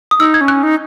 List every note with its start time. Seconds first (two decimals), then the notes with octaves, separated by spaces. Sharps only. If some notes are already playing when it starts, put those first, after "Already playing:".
0.11 D#6
0.19 D#4 E6
0.34 G#6
0.41 C#4
0.48 F#6
0.63 D#4